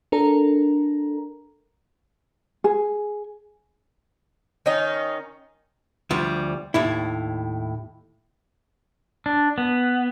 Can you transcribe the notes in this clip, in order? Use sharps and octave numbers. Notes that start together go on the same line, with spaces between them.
D4 A4 A#4 A#5
G#4
D#3 C#4 D#4
D2 F3 G3
D#2 A2 E4
D4
B3